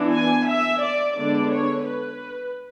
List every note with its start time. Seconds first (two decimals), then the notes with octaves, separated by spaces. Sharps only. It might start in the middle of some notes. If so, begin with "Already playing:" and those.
Already playing: E3 B3 D4
0.13 G#5
0.48 E5
0.82 D5
1.16 D3 G#3 B3 D4 D5
1.52 C#5
1.86 B4